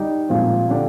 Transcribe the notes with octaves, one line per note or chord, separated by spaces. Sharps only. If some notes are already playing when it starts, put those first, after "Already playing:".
Already playing: G3 D#4 G4
A#2 F3 G#3 C4
D3 G3 D4 G4